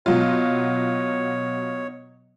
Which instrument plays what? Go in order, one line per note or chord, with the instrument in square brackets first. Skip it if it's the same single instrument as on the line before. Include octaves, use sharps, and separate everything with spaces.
[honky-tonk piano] B2 F#3 F4 [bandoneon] C#5